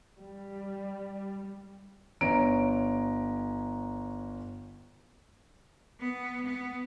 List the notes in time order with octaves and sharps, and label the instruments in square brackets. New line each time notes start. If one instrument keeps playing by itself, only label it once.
[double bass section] G3
[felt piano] G1 C#4 A#5 D7
[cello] B3
B3